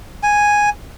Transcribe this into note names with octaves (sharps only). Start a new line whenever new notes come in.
G#5